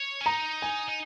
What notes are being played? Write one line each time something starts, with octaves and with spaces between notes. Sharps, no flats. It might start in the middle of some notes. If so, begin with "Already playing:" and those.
Already playing: C#5
C#4
D#4 A#5
G#5
D#4